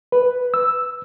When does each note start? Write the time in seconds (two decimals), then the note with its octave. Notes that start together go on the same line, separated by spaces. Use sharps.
0.12 B4
0.54 E6